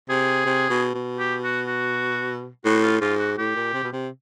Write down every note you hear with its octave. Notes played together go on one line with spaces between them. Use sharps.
C3 G#4
C3
B2
B2
G4
F#4
F#4
A2 F#4
F4
G#2 F4
F#4
A2 G4
A#2
C3
B2
C3